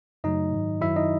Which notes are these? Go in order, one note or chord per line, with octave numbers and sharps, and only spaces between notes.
F#2 C#3 F#3 A3 D#4 D#5
G#2 D#3 F#3
F#2 D#3 F#3 E4 E5
D#4 D#5